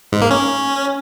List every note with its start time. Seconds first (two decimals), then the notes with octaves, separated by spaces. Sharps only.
0.12 G#2
0.21 A#3
0.30 C#4